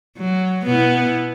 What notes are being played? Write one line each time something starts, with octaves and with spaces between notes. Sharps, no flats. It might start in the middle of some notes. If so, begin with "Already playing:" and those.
F#3
B2 B3 E4